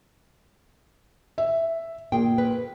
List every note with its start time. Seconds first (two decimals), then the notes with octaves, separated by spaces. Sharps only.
1.38 E5
2.12 A#2 G#4 G5
2.38 B4